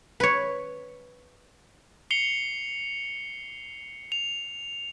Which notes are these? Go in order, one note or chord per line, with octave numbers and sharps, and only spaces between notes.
B4 C#5
C7 C#7 F7 G7
F7